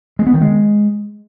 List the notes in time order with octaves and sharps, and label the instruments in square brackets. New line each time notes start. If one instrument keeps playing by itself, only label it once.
[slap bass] G#3
B3
D#3
G#3